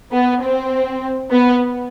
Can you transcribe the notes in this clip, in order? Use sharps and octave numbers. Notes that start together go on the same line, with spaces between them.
B3
C4
B3